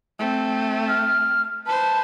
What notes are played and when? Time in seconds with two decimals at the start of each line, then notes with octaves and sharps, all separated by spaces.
0.19 A3 C4
0.88 F6
1.66 B4 C5 A5